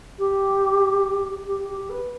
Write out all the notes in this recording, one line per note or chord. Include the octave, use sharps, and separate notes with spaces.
G4
G4
G4
B4